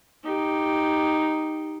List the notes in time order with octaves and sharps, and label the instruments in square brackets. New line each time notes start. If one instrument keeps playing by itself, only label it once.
[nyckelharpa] D#4 G4